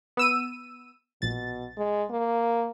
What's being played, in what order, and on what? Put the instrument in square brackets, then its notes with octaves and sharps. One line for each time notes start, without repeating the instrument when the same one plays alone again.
[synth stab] B3 E6 D#7
[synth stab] A#1 A6 [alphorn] B2
[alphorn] G#3
A#3